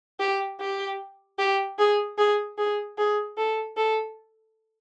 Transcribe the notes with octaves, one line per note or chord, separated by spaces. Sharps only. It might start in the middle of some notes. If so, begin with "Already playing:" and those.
G4
G4
G4
G#4
G#4
G#4
G#4
A4
A4